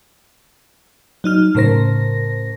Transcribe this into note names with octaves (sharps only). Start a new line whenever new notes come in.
F#3 D#4 F6
A2 C#3 A#4 C5 A#6